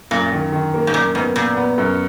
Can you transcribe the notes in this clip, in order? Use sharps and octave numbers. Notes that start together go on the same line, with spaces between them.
F#2 A#2
D#3
D#3
A#3
G#2
F#2 A#2
G#2 B3
A#2 B3
B3
F#2